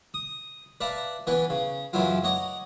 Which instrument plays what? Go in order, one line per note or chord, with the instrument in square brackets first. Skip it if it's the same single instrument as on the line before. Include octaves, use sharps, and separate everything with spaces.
[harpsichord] D#6
B4 D5 E5 F5 A5 A#5
E3 B3 C#4 D4 B4
C#3
F#2 C#3 E3 F#3 E4 F4
C#5 D#5 F#5 A#5 D6